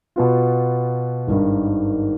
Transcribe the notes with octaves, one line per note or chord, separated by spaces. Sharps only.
B2 B3 F4
G#1 G2 D#3